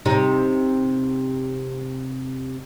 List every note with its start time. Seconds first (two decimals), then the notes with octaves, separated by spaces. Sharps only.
0.06 C3 D#4